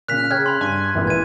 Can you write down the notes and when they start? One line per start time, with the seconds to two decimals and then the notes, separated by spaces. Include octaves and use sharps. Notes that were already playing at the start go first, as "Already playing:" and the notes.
0.08 A#2 C#3 F6 F#6 B6
0.31 C#3 G5 F6 G#6
0.46 B5 C6
0.61 G2 G#5
0.95 E1 A1 A#2 E3
1.07 G#6 D#7